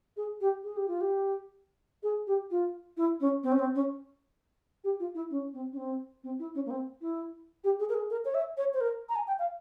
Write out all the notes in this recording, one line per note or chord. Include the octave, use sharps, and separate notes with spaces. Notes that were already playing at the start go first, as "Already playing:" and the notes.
G#4
G4
G#4
G4
F4
G4
G#4
G4
F4
E4
C#4
C4
C#4
C4
C#4
G4
F4
E4
C#4
C4
C#4
C4
C4
E4
C#4
A#3
C4
E4
G4
G#4
A#4
G#4
A#4
C#5
E5
C#5
C5
A#4
A#5
G#5
G5
F5